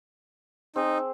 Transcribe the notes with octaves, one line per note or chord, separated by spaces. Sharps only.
C4 D#4 G#4